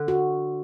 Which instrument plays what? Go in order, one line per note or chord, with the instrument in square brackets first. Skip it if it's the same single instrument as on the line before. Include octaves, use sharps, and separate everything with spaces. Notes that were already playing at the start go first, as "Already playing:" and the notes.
Already playing: [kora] D3
[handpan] F#4